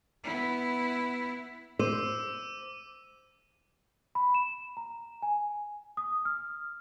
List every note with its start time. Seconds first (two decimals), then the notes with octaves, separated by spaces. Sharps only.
0.24 B3 E4
1.79 C5 D6 E6 D#7
4.15 B5
4.34 E7
4.77 A#5
5.22 G#5
5.97 D#6
6.25 F6